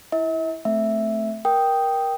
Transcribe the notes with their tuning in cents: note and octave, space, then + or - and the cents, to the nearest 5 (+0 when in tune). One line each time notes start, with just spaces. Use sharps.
E4 +0 E5 -45
A3 +0 C4 +0 E5 +0
A#4 +20 G5 +0 D#6 +0